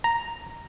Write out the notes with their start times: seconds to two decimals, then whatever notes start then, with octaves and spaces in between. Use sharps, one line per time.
0.04 A#5